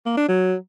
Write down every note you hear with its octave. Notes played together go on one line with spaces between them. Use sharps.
A#3
D4
F#3